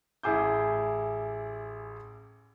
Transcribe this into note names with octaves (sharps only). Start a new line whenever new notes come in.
A1 E4 G#4 D6 G6